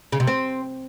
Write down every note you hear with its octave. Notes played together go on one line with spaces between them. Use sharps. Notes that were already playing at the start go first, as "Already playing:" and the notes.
C#3
C3
C4